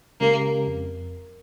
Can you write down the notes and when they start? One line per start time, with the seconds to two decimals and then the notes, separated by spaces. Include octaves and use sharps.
0.20 C#3 G#3 A#3 C#4 G4
0.67 F2